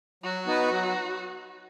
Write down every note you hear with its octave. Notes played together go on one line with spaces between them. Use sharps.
F#3 F#4
B3 D#4 B4
F#3